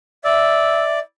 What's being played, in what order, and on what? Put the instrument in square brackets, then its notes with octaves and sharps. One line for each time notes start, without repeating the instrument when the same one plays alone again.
[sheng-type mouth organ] D5 [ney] E5 [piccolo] E6